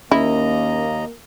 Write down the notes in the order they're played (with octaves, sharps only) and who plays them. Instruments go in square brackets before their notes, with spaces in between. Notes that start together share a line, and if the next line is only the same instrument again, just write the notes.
[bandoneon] D#2 D#5 A#5 [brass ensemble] A#3 [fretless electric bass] C#4 [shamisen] E4